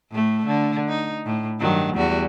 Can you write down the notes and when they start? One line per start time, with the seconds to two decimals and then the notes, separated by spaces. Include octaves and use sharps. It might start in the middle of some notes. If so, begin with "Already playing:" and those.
0.12 A2 A3
0.46 D3
0.88 D#4
1.26 A2
1.60 G2 D#3 F#3
1.96 E2 G3 F#4